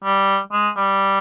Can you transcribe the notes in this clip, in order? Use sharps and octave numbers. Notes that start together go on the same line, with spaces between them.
G3
G#3
G3